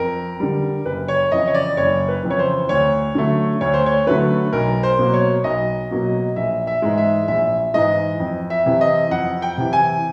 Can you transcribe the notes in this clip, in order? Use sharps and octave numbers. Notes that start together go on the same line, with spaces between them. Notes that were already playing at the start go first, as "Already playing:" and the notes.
Already playing: F2 A#4
D3 G3
F#1 B4
C#5
F2 C#3 E3 D#5
C#5
D5
F#1 C#5
B4
F2 C#3 E3
C#5
C5
D2 C#5
D3 F#3 A3
D2 C#5
C5
C#5
D3 F#3 A3 B4
B1 A#4
C5
B2 F#3 A#3
C#5
B1 D#5
B2 F#3 A#3
A#1 E5
E5
G#2 E3 G#3
E5
A#1 E5
G#2 E3 G#3 D#5
F2
E5
C3 E3
D#5
F2 F#5
G5
C3 E3
G#5